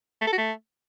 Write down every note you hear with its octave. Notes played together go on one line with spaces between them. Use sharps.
A3
A4
F#4
A3